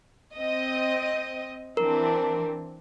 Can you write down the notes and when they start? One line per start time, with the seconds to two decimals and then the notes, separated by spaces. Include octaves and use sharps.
0.36 C4 D#5
1.77 E3 C4 D4 A#4